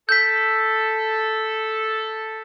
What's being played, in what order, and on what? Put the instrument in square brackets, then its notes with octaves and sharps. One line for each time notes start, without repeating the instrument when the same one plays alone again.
[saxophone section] A4 [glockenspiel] G6 B6